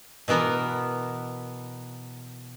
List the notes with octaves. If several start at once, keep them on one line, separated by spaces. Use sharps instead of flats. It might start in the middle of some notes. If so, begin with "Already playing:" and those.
B2 E3 B3 A#4